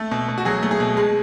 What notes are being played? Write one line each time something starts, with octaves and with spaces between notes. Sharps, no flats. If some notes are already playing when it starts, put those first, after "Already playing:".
Already playing: A3 A4
B2
B2
F#4
F#3 G#4
A3
G#4
B2
G#3